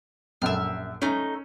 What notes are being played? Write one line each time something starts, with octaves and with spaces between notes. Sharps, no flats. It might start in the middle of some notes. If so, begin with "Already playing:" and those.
A#1 F#2 A4 E5 F6
A3 C#4 D#4